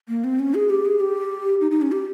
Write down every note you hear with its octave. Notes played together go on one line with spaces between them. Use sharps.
A#3
C4
C#4
G#4
G4
G#4
G4
D#4
D#4
C#4
G4